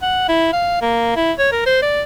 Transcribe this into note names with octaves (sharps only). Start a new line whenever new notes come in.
F#5
E4
F5
A#3
E4
C#5
A#4
C5
D5